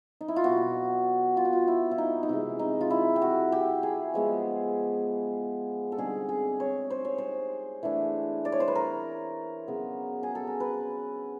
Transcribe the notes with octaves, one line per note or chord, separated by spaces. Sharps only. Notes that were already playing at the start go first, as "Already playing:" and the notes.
D#4
E4
F4
B2 F#3 B3 F#4
F4
F#4
F4
E4
E4
D#4
D#4
C3 E3 G#3 E4
D#4
F4
E4
G4
F#4
G4
G#4
F3 G#3 B3
A4
D3 G3 C4 D#4 G#4
G#4
C#5
C5
C#5
C5
E3 A3 D4
D5
C#5
C5
B4
A#4
C#3 F#3 B3
G#4
A4
A#4
B4